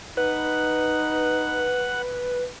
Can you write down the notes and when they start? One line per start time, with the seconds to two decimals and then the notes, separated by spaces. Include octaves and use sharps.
0.17 D#4 B4 F#5